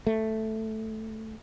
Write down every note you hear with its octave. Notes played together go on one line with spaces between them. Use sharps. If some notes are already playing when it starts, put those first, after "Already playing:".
A3